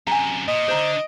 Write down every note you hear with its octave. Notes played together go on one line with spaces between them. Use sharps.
F#2 C3 G#5 A#5
A#2 D#5
D3 D4 C5 A#5